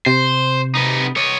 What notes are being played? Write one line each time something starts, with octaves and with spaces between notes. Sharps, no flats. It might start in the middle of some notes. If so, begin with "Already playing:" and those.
C3 C5
D#4 B4
C#5 D#5